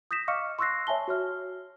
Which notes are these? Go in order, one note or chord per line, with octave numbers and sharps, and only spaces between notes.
D#6 G6 A#6 B6 E7
D#5 F5 C#6 D6 F6 C#7
C6 C#6 E6 F#6 A#6 C7
C#5 E5 G#5 A5 G7
F#4 C#5 F6